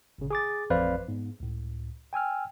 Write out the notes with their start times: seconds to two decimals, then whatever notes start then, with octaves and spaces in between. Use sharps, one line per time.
0.18 G1 A#2 C#3
0.31 G#4 D6 A6
0.70 A1 F2 B4 C5 D5 F5
1.08 G#2 B3
1.40 C#2 A2
2.13 G5 G#5 E6 F6